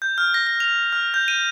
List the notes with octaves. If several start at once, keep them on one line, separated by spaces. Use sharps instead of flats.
G6
F6
A#6
A#6
F7
F6
G6
D#7